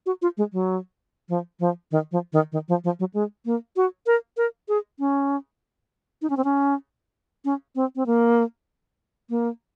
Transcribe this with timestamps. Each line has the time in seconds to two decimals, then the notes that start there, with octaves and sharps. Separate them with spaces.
0.06 F#4
0.22 F4
0.37 G#3
0.53 F#3
1.29 F3
1.60 F3
1.91 D#3
2.12 F3
2.33 D#3
2.52 D#3
2.68 F3
2.84 F3
3.00 F#3
3.14 G#3
3.45 A#3
3.76 F#4
4.06 A#4
4.37 A#4
4.69 G#4
4.99 C#4
6.22 D#4
6.30 C#4
6.37 C4
6.44 C#4
7.45 C#4
7.75 C4
7.96 C4
8.06 A#3
9.30 A#3